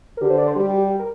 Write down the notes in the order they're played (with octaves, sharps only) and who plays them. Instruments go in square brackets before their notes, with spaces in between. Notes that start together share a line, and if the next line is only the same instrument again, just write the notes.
[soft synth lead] A#4
[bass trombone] D3 [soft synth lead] G4
[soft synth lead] C5
D5
C5
[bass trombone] G3 [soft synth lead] G4
[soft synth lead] G4
G4
A#4